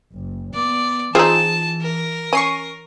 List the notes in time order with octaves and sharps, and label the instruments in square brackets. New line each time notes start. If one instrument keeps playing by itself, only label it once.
[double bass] F#1
[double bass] B3 [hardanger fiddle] D5
[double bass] E3 [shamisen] C4 D#4 [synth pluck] F4 G#4 [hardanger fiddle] A5
[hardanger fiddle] A#4
[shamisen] C#4 [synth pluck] C#6 C7 D#7